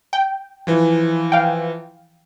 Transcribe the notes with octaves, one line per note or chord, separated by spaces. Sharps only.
G5
E3 F3
F5 G5